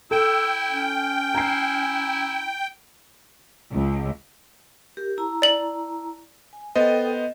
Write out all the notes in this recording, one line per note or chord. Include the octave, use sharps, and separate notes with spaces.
E4 A4 G5 E6
C#4
E4 A#5 C7
C#2
G4 A#4
E4 A5 A#5
D5 F#7
G#5
B3 A4 C5 D#5 G5